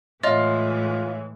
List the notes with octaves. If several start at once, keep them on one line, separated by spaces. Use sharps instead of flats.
A2 E3 G#3 F4 C#5 D#5 E5